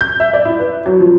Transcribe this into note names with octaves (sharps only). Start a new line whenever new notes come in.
G6
E5
D5
E4
B4
F#3
F3